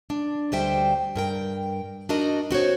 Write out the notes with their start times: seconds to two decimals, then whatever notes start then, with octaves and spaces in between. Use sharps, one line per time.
0.10 D4
0.52 D2 B2 G3 C5 E5 G5
1.16 G2 A#4 G5
2.09 D4 D#4 F#4 A#4 D#5
2.51 C4 F#4 C5 C#5